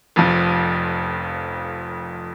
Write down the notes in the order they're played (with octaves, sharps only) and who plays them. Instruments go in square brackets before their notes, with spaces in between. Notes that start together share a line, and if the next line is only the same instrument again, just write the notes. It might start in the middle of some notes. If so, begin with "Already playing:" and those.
[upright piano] F1 F2 F3